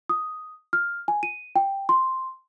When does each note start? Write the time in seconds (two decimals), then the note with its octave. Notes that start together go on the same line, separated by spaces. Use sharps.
0.09 D#6
0.73 F6
1.08 G#5
1.23 D#7
1.56 G5
1.89 C6